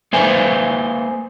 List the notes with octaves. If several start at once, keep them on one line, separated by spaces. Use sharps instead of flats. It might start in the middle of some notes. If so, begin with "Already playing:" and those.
A#3 A4 B4 C5 E5 G#5